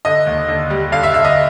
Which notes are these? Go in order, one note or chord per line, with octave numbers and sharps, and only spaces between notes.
D3 D#5
D#2
D3
G3
D3 F5
E5
D3 E5
D#5